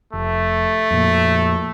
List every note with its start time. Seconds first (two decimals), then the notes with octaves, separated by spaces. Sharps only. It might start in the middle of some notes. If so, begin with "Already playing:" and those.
0.13 F1 A3
0.91 F2 A#2